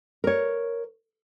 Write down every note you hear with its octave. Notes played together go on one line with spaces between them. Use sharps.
A#4 C#5